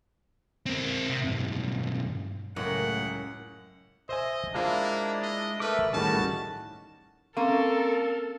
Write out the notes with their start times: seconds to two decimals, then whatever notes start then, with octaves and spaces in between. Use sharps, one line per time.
0.66 C4 A#4
1.10 C3
1.21 B1 G2
2.56 C#2 F#2 A2 F#5
4.09 C5 D#5 E5 G#5
4.55 G#3 A#3 D4 E4 F4 C5 F5
5.22 D#5
5.60 A3 A#4 B4 D6
5.93 A2 D#3 G3 C#4 D#4 F#4 G#4 A5
7.37 A#3 C4 C#4 A4 A#4